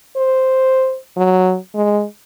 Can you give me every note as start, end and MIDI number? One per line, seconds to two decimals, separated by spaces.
0.17 0.97 72
1.17 1.57 54
1.75 2.04 56